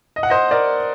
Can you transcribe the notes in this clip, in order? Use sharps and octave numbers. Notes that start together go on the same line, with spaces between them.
D#5
F#5
C5 D#5
A#4 D5